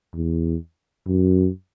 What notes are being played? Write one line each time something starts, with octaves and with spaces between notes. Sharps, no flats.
E2
F#2